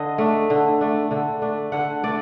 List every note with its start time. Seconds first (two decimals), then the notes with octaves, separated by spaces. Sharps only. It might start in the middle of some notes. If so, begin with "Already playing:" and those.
Already playing: D3 D#5
0.18 A3 D4
0.50 D3
0.81 A3 D4
1.11 D3
1.42 A3 D4
1.72 D3 F#5
2.03 A3 D4 D5